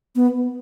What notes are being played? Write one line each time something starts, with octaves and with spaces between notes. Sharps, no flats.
B3